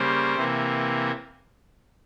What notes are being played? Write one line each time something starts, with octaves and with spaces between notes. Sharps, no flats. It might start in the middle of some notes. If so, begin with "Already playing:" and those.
Already playing: C#3 G3 A#3 C5
C3 E3 A#3